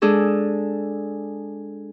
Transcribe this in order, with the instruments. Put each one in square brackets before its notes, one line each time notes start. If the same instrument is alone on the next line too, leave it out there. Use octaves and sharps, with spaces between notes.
[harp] G#3 D4 G#4 A4